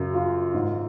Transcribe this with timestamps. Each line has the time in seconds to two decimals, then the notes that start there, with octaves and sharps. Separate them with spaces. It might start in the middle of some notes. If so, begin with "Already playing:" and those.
Already playing: F#2 C#3
0.14 F4
0.54 G#2 D#3